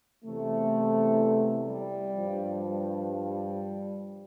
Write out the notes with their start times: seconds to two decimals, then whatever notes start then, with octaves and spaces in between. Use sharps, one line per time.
0.25 E2 C3 E3 A3
1.67 G3
2.15 G2 F3
2.62 G3
3.09 G3